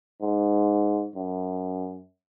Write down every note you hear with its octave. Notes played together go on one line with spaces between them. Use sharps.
G#2
F#2